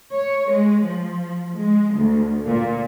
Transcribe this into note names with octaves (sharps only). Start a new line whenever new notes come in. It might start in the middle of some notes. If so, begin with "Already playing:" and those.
C#5
G#3
F3
G#3
D2
A#2